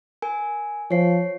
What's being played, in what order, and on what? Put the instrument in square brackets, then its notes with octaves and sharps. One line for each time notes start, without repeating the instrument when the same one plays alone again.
[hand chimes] A#4 G#5
[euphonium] F3 [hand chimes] C#5 C7